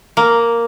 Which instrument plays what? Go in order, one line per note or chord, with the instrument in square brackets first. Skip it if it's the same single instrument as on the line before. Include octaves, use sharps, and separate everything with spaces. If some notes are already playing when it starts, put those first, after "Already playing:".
[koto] A#3